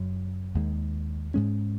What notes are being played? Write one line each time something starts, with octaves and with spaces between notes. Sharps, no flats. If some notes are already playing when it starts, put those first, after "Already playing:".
Already playing: F#1 F#2 F#3
D#2 D#3 G#3
G#2 G#3 C#4